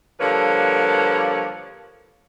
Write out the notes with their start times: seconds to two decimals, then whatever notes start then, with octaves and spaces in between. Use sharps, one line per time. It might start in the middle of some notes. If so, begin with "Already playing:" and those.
0.19 D3 F3 G3 A#3 B4 C#5